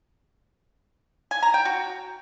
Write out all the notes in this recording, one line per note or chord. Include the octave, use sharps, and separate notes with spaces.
G#5
A#5
G5
F#4